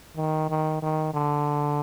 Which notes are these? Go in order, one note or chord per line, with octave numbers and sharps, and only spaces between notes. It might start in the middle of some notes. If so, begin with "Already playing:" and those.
D#3
D#3
D#3
D3